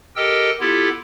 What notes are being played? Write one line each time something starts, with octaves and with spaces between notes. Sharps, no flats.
G4 A4 A#4 D#5 G5 E6
B3 E4 F4 G4 A4